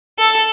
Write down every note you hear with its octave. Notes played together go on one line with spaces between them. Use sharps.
A4